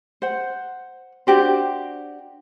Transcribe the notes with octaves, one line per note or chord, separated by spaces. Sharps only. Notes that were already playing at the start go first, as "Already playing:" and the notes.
C5 F#5
D4 F#4 G4 C5